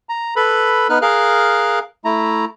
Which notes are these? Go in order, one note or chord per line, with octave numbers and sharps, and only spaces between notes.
A#5
A4 B4 B5
B3 D#4 B4 F6 F#6
G#4 A#4 F5 F6 F#6
A3 E4 A#5